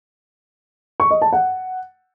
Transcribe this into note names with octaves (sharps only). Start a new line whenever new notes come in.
C#6
D#5
A5
F#5